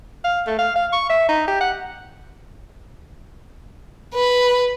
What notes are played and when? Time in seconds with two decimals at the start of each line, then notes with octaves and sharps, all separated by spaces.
0.24 F5
0.47 A3
0.58 F5
0.75 F5
0.92 C#6
1.09 E5
1.28 D#4
1.48 G4
1.60 F#5
4.14 B4